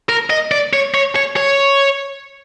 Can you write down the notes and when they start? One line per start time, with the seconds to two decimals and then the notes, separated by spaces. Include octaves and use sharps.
0.09 A#4
0.30 D#5
0.51 D5
0.73 C#5
0.94 C#5
1.16 C#5
1.37 C#5